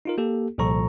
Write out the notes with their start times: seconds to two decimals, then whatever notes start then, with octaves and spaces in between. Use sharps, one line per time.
0.05 D#4 F4 A#4
0.18 A#3 G4 A4
0.58 C2 A#2 F3 A4 A#5 C#6